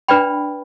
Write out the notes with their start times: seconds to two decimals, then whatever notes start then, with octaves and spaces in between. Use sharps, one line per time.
0.08 D4 B4 D5 G5 B5